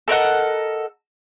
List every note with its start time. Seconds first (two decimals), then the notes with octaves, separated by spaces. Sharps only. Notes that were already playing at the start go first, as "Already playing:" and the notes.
0.08 A4 A#4 D#5 F#5